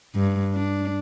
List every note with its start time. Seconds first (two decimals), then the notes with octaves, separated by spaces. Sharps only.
0.15 G2
0.54 D4